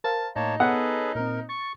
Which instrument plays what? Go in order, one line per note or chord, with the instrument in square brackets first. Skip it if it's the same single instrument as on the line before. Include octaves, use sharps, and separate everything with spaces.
[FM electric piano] A#4 C5 F5 [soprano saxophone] A5
[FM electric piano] A2 [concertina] A#3 C#5 A5 [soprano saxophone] D#4
[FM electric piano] B3 C#5 [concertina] G#4 A4 B4 [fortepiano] F#5
[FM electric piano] A#2 C4 [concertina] A#4
[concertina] C#6 [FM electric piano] A6